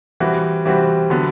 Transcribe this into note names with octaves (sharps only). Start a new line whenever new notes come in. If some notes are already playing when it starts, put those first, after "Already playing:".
E3 G3 C4 F#4
E3 G3 C4 F#4
D3 F#3 B3 F#4